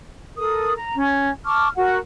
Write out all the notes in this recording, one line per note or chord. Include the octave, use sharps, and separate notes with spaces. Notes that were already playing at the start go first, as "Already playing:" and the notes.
A4 A#4 D#6
A#5
C#4
A5 C#6 D6 F6
F#4 A#4 F#5